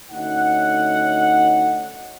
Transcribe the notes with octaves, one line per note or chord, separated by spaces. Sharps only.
D2 C#4 D#4 F#5